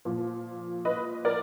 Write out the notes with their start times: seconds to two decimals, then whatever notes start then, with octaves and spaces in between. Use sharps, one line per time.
0.05 A#2 F3
0.85 B4 D#5
1.25 A#4 D5